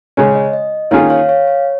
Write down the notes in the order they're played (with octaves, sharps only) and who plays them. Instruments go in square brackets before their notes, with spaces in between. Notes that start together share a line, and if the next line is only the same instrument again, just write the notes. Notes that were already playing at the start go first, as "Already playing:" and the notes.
[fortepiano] C#3 G#3 C#4 [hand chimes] C#5
[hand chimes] D#5
D#5
[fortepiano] D#3 A#3 C#4 F4 G#4 [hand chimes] C#5 F5
[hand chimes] C#5 F5
C#5 F5
C#5